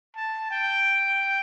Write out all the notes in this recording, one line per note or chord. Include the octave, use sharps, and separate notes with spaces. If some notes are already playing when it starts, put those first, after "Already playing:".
A5
G5